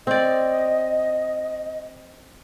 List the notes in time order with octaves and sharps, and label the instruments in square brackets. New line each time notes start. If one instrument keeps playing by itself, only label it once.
[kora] C4 D5 [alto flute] D#5